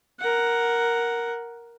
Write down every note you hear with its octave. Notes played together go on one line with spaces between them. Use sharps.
A#4 F#5